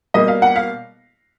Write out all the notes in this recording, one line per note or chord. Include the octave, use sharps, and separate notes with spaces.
B2 G3 A#3 D#5
F5
F#5
F5